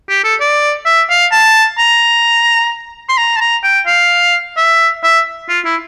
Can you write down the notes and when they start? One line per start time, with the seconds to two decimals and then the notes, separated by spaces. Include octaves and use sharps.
0.09 G4
0.24 A4
0.41 D5
0.86 E5
1.10 F5
1.32 A5
1.79 A#5
3.09 C6
3.18 A#5
3.37 A5
3.41 A#5
3.64 G5
3.87 F5
4.57 E5
5.04 E5
5.49 F4
5.65 E4